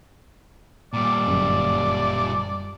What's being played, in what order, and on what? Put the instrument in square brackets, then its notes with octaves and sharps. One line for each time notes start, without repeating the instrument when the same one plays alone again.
[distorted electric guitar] A#2 G3 [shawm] D5
[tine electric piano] G1 F#2